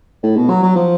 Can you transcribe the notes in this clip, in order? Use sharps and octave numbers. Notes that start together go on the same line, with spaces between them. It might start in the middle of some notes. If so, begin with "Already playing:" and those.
A2
B2
F#3
F#3
F3